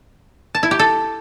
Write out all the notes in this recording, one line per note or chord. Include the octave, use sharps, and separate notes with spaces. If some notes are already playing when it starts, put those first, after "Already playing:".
A5
E4
G4
A4